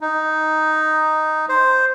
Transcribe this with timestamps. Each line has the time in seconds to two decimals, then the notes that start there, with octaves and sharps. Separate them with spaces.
0.01 D#4
1.49 C5